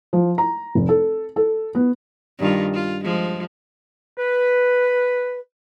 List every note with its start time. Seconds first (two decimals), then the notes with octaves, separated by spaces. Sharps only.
0.13 F3
0.38 A#5
0.75 F1
0.89 A4
1.36 A4
1.75 B3
2.39 G2 D#3 F4
2.74 F4
3.04 F3 G#3
4.18 B4